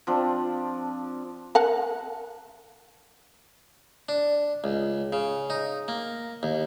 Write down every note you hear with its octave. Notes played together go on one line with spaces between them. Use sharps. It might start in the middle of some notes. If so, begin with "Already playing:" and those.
F3 C4 D4
A#4 F#5 A5
D4
C#2
C#3
D#4
A#3
D#2